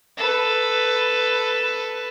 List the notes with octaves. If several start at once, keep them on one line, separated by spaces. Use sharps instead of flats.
A4 B4